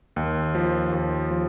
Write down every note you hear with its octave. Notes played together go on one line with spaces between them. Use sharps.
D#2
F3
D#2
F3